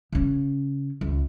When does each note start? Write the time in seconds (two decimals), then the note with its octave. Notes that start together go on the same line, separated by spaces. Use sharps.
0.12 C#3 C#4
1.01 C#2